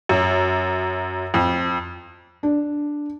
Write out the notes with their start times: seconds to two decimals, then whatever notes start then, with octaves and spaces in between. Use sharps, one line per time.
0.09 F#2
1.34 F2
2.43 D4